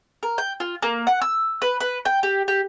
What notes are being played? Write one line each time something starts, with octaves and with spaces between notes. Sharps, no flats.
A#4
G5
F4
A#3
F#5
E6
B4
B4
G5
G4
G4